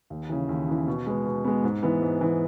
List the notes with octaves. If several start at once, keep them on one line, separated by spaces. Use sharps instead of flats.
D#2
C#3 E3
D#2
C#3 E3
B2
G#3 B3
B2
G#3 B3
G#2
E3 B3
G#2
E3 B3